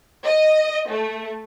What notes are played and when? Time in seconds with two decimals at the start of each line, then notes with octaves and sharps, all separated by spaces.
0.24 D#5
0.89 A3